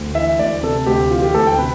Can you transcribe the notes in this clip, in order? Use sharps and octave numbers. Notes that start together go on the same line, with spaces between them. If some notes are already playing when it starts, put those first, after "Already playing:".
Already playing: D2
E3 E5
D2 D5
C3 A4
D2 G4
E3 F4
G4
D2 A4
G5
C3 B4